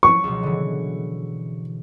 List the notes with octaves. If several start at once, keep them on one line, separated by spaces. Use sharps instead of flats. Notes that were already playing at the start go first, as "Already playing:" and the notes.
F3 F#3 C#6
C#2 B2
D3 E3